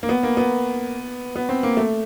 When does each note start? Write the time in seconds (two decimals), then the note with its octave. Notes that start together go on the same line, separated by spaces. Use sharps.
0.03 A#3
0.09 B3
0.23 A#3
0.37 B3
1.36 B3
1.49 C4
1.63 A#3
1.77 A3